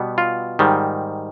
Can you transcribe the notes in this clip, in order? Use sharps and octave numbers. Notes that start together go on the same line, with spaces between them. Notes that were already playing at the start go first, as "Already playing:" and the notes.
Already playing: B2 G3 B3
F4
G#2 D#3 G3